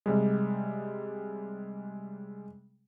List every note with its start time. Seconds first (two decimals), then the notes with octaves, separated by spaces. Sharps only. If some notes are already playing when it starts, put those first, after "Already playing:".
0.06 C3 G3 G#3